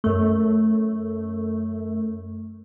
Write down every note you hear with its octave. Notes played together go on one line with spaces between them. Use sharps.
F#2 A3